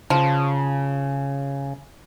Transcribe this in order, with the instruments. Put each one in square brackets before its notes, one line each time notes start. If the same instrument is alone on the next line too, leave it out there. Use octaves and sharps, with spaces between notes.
[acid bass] C#3 [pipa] F3